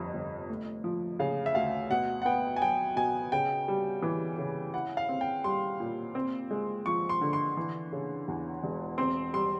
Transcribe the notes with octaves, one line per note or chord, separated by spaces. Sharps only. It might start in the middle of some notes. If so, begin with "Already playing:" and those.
Already playing: G1 F2 C3
G1
A3
F3
C#3 F5
E5
D2 F5
B2 F#5
F#5
B3 G5
G#5
F#3 G5
B2 G#5
C#3 G5
G3
E3
C#3
E4 F#5
F5
C4
G5
G3 C6
A#2
C4
G#3
F3 C#6
C6
D3
C6
E3
C#3
E2
E1
C4 C6
G3 C6